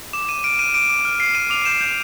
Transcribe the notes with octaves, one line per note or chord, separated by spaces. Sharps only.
D6 E7
D6 D#7
F6 D7
F6 D#7
D6 D7
D6
F6
F6 C7
D6 D#7
D6 F7
G6 E7
G6